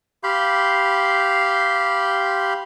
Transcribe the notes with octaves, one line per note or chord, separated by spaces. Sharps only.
G4 F5 B5 C6 G6